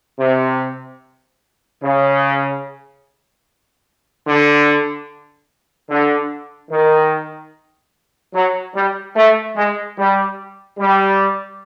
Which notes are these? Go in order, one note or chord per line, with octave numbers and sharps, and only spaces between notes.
C3
C#3
D3
D3
D#3
F#3
G3
A3
G#3
G3
G3